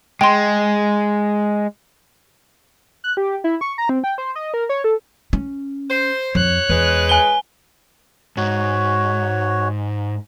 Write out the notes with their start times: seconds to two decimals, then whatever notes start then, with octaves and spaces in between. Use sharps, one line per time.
0.21 G#3 G5 C6
3.04 F#6
3.17 G4
3.44 E4
3.61 C#6
3.78 A#5
3.89 C4
4.04 G5
4.18 C5
4.36 D#5
4.54 A#4
4.69 C#5
4.84 A4
5.33 C#4
5.89 C5
6.35 F2 C#5 F#6
6.69 E2 G#3 B4
7.09 G#5 G7
8.37 G#2 F#4 C#5